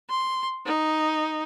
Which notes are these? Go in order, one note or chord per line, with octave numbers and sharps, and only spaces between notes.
C6
D#4